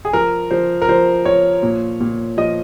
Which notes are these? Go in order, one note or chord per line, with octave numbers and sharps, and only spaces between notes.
G#4
F3 A#4
F3 C5
A#4
F3 C5
F3 C#5
A#2
A#2
F3 D#5